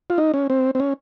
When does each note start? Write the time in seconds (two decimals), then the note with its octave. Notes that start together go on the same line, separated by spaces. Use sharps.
0.10 F4
0.18 D#4
0.34 C#4
0.50 C4
0.75 C4
0.80 C#4